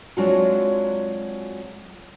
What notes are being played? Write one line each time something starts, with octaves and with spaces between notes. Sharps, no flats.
F#3 G#3 C4 D4 F4 F#4